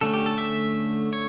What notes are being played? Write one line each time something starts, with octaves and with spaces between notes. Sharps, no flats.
D3 A3 C#4 A4
G4
A4
E5
C#5